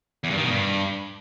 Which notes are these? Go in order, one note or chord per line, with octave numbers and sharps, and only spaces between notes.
E2
G2
D#3
B2
G2